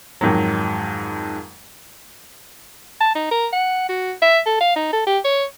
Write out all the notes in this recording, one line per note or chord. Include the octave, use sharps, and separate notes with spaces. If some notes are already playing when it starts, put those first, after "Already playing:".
F2 G#2 D#3 F#3
A5
D#4
A#4
F#5
F#4
E5
A4
F5
D#4
A4
G4
C#5